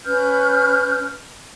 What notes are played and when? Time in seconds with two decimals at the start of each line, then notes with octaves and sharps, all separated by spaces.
0.05 C#4 B4 F6 G6